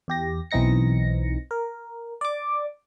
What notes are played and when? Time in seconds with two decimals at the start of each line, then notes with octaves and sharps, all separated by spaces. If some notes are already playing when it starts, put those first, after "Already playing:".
0.08 E2 G4 A#6
0.51 B1 E3 C4 D#4 A#6 C#7
1.51 A#4
2.21 D5 D6